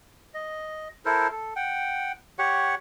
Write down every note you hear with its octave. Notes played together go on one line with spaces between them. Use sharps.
D#5
E4 A4 A#4 C5
A4
F#5 G5
G4 C#5 F#5 C#6